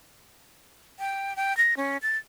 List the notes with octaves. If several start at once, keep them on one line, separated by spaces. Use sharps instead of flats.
G5
G5
A#6
C#4
A6